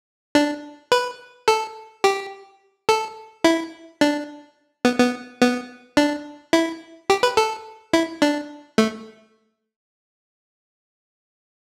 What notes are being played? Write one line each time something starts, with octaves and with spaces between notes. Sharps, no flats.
D4
B4
A4
G4
A4
E4
D4
B3
B3
B3
D4
E4
G4
B4
A4
E4
D4
A3